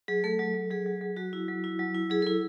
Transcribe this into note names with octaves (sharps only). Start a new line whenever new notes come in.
F#3 G#4
A3 A4
F#3
F#3
F#3 G#4
F#3
F#3
F#3 F#4
E4
F#3
E4
F#3
E4
F#3 G#4
E4 A4